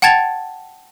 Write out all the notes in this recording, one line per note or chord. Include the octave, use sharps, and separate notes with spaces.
F#5 G5 A5 G#6 A6 F7